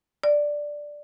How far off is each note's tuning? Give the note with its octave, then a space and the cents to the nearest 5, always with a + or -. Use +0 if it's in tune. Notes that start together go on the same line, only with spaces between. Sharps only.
D5 +0